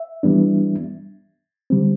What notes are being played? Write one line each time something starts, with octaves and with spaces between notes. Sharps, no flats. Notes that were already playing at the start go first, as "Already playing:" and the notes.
Already playing: E5
E3 G3 B3 D4
D3 G3 C4